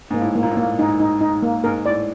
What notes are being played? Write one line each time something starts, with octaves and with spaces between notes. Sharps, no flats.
G#2 A#3
A2
A#3
A#2
A2
A#3
G#2 D#4
D#4
D#4
A#3
G#2 A#4
A2 D5